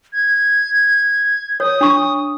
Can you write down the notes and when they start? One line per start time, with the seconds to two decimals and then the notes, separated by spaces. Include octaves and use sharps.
0.13 G#6
1.60 C#5 D#6
1.81 D4 C#6